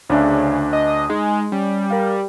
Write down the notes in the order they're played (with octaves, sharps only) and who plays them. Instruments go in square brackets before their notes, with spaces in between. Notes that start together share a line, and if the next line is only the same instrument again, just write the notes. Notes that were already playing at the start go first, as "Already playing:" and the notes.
[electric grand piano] D2 D4 E5 [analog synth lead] C#3
[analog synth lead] D#5
[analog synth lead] G#3 [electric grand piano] D#4
[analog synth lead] G3 [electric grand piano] C#4
[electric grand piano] A#4 F5